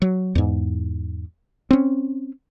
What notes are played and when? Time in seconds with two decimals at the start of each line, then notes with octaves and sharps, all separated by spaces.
0.02 F#3
0.35 E2 G#2
1.71 C4 C#4